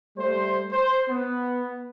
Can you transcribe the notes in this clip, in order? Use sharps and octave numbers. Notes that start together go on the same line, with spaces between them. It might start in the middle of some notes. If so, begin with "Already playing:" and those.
G3 A3 C5
C5
B3